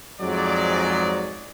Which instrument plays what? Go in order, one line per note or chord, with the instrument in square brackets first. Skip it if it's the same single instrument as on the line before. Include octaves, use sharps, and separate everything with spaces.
[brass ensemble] F2 G#2 F#3 G#3 D5